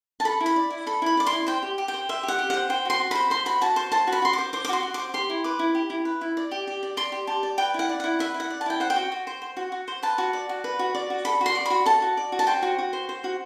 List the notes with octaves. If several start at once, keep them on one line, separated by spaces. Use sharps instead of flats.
A5
A4 B5
E4
B5
D5
E4
A4 B5
E4 B5
D5 D6
C6
E4
C5 G5
G4
G4
G5
C5
C5 E5
G4
F#5
G4
C5 F#5
C5 G5
F#4 C6
F#4
C5 B5
C5 C6
F#4 B5
F#4 A5
C5
C5 A5
F#4
B5
F#4 C6
D6
C5
C5 D6
D6
F#4 C6
F#4
D6
C5
G4 C6
E4
B4 D6
E4
G4
E4
B4
E4
D5
G4
G4
D5
D5 C6
G4
G4 A5
D5
B4 G5
E4 F#5
D5
E4 F#5
B4 E5
E4
F#5
D5
A5
E4 G5
C5 F#5
G5
F#4
F#4
C5
C5
F#4
F#4
C5
B4 A5
F#4
D5
F#4
B4
F#4
D5
F#4
A4 B5
F#4 C6
D5
F#4 B5
A4 A5
F#4
D5
F#4
A5
C5 G5
F#4
F#4
C5
C5
F#4